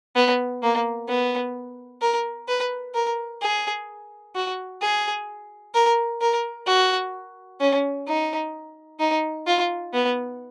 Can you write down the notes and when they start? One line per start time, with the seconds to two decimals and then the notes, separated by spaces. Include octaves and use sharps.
0.16 B3
0.63 A#3
1.09 B3
2.02 A#4
2.48 B4
2.94 A#4
3.41 G#4
4.35 F#4
4.82 G#4
5.74 A#4
6.21 A#4
6.67 F#4
7.61 C#4
8.07 D#4
9.00 D#4
9.47 F4
9.93 B3